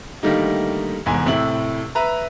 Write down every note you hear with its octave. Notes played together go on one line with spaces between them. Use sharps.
D3 D#3 G3 A3 A#3 D#4
F1 E2 G#2 G#5
A2 C3 E4 F#7
B4 E5 A#5